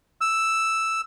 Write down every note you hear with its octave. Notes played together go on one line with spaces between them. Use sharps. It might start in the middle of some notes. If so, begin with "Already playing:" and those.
E6